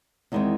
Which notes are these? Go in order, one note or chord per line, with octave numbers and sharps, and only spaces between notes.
E2 D#3 G#3 C4